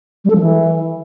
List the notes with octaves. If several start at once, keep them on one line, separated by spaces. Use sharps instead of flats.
G3
A4
F3
E3